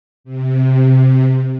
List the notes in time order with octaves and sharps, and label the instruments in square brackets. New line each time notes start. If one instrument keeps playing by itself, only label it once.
[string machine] C3